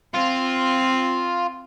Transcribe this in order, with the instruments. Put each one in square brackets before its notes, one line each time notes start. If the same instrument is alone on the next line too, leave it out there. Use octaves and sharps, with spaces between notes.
[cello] C4 [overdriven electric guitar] F4